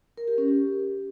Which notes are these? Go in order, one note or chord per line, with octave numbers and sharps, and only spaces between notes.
A#4
G4
C#4
G4